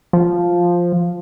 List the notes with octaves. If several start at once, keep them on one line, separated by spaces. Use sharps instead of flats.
F3